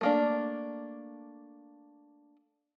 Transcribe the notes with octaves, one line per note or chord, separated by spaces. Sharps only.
A3 A#3 D4